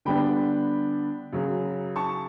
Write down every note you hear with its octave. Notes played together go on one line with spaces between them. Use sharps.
D3 G3 B3 D4 G5 B5
F#2 C#3 F#3
A5 C#6